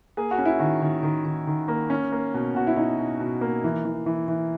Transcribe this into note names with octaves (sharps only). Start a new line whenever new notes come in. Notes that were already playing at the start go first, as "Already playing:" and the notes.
A#3 G#4
F#4
C#4
E4
D#3 F#4
D#3
D#3
D#3
D#3
A#3
C#4
A#3
B2
B2 F#4
E4
B2 D#4
B2
B2
A#3
E3
E3
E3
E3